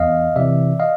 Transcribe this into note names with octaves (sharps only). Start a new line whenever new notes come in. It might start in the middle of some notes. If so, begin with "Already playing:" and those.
Already playing: E2 D#5 F5
C3 E3 D5 E5
D#5 F5